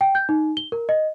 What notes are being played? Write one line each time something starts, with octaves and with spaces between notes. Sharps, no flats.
G5
G6
D#4
G7
A#4
D#5